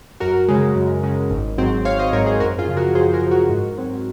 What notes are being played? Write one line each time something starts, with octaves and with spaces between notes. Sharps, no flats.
F#2 F#4 A#4
C#3 G#3
F#2
C#3 G#3
G#1
G#2 F#3 C4
G#1 C#5 F5
C5 D#5
G#2 F#3 C4 A#4 C#5
G#4 C5
F#2 F#4 A#4
F4 G#4
C#3 F3
F#4 A#4
F#2 G#4 C5
F#4 A#4
C#3 F3
F#4 A#4
G#2
F#3 C4